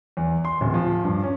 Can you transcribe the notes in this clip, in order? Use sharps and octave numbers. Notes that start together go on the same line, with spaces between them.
E2
C6
D1
F3
G2
C#4